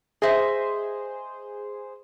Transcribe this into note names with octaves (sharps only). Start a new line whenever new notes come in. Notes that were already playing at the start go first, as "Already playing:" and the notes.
G#4 C5 D#5 E5